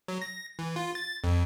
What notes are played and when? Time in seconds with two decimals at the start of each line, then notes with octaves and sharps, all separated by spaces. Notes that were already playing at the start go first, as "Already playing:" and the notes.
0.08 F#3
0.22 A#6
0.59 E3
0.76 F4
0.95 A6
1.24 F2